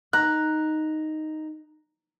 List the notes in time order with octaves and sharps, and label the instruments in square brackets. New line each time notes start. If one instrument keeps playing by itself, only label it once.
[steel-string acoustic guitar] D#4 [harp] A#5 F#6